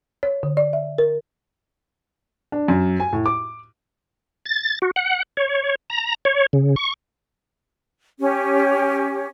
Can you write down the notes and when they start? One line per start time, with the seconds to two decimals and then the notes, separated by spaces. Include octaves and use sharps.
0.23 C#5
0.43 D3
0.57 D5
0.73 E5
0.98 A#4
2.52 D4
2.68 F#2
3.00 G#5
3.13 A2
3.26 D6
4.46 A6
4.82 F#4
4.96 F#5
5.37 C#5
5.90 A#5
6.25 C#5
6.53 C#3
6.76 C#6
8.19 C#4 G4